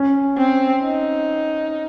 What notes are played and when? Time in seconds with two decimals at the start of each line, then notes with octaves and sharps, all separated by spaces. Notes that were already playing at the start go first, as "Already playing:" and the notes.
Already playing: C#4
0.38 C4
0.84 D#4